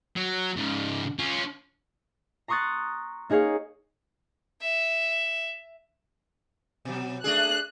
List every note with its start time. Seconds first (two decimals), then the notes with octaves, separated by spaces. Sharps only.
0.16 F#3
0.57 G#2 C#3
1.19 C#4 F4
2.48 A#5 C6 C#6 D#6 F#6 A6
3.30 A#3 D#4 G#4 C#5 F5
4.61 E5
6.85 B2 F#3
7.24 A3 D4 G#4 F#6